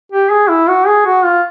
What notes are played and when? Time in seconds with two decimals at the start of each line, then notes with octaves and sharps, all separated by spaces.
0.12 G4
0.30 G#4
0.49 E4
0.69 F#4
0.87 G#4
1.06 F#4
1.25 F4